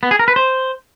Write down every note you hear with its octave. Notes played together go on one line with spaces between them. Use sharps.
B3
G#4
A#4
B4
C5